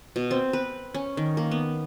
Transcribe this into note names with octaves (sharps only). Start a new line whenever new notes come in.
B2
C4
B4
C#4
D#3
A#3
B3